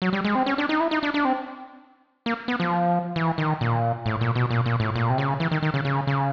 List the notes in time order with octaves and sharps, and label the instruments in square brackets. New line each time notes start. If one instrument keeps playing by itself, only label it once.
[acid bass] F#3
G3
G#3
C4
C#4
D4
D#4
E4
D#4
D4
D4
C4
A#3
B3
F3
E3
D#3
A#2
A2
A#2
B2
A#2
A#2
A2
A#2
C3
C#3
E3
D#3
D#3
C#3
C#3
C#3